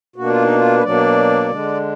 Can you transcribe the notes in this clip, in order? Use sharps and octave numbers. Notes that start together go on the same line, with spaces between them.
B2 A#3 D4 F#4
F4
D#4
F4
B4
B2 F#3 A#3 D4 D5
D3 G#3 D4